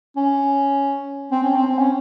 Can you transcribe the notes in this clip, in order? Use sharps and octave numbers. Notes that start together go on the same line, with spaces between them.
C#4
C4
C#4
C4
C4
C#4